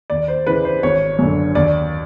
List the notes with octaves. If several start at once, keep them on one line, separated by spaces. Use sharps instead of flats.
D#2 D5
C5
C#3 E3 B4
C5
G#1 C#5
F#2 D3
D#2 D5